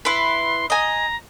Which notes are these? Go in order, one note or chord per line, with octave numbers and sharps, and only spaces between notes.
E4 B4 C6
D#5 G#5 A#5